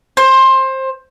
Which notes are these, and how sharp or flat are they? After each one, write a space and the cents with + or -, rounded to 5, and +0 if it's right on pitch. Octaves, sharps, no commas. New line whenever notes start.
C5 +20